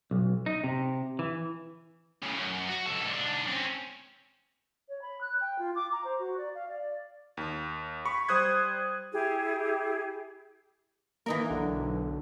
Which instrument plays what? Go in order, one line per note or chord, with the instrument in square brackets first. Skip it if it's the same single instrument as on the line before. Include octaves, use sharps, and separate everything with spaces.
[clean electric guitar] B1
D#4
C3
E3
[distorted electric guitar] A2 C#3
F#2
F#4
C#2 A4
G#2 D4
C4 C#4
[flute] C#5
B5
F#6
G5
F4
D6
A#5
C5
F#4
D5
F5
D5
[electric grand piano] D#2
B5 C#6
G3 C5 D#6 F#6 G#6
[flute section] E4 G4 G#4
[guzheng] E3 D#4 A#4 [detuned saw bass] A#3 [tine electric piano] A#5
[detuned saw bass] B1 [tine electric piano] D3